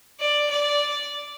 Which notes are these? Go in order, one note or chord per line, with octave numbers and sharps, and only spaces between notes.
D5
D5